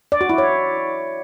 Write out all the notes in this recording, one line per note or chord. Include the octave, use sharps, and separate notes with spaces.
D5
F#4
E4
C#5